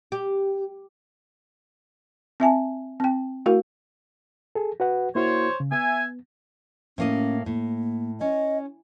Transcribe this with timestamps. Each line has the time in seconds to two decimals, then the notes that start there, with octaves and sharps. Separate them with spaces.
0.12 G4
2.40 C4 E5 G#5 A5
3.00 C4 G5
3.46 A3 E4 F#4 A#4 F5
4.55 G#4 A4
4.80 F#4 B4 F#5
5.15 A#3 E4 F#4 C5 C#5
5.60 C#3
5.72 B3 E5 G#5
6.98 A2 A#3 C#4 D#5
7.46 A2 A#3
8.21 C#4 D#5